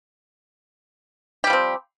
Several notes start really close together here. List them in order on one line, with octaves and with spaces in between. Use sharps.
G4 G3 F3 C4